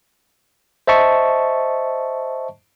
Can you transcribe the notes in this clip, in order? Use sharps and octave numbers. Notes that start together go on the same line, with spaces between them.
C5 D#5 E5 A5 C#6